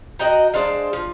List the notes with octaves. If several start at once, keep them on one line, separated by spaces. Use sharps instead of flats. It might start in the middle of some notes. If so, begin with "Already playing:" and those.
F#4 D#5 G5 A#5
G#3 D4 C5 F5
F3